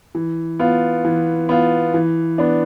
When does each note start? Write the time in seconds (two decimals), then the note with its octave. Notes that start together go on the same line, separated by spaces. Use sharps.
0.15 E3
0.59 B3 F4
1.05 E3
1.49 B3 F4
1.94 E3
2.38 B3 D4